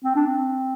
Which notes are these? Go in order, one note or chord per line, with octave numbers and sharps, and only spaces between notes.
C4
D4
C4